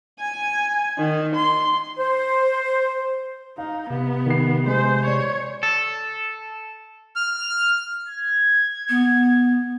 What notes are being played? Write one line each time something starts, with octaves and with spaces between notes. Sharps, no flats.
G#5
D#3
C6
C5
D#4 F5
C3 B3
D#3 C7
G#3 C5
C#5 D5
A4
F6
G#6
B3